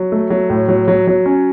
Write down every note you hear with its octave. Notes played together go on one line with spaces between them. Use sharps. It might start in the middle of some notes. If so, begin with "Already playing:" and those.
Already playing: F#3
A3
F#3
A2
F#3
F#3
F#3
C#4